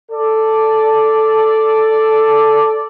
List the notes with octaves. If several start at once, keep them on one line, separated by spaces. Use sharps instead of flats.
A4 D5